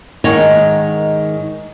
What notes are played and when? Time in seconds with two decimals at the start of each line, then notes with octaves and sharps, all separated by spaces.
0.24 G#2 D#3 C#5